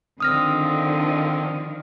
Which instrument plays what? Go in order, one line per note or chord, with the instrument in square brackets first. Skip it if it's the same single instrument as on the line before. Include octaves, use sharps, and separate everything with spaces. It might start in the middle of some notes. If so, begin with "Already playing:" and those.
[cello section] D3 D#3 F3 [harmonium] C4 [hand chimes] D#6 F6 A#6